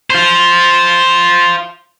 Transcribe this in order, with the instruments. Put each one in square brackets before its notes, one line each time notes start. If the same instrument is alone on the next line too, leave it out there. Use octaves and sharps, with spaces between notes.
[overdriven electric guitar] F4 C5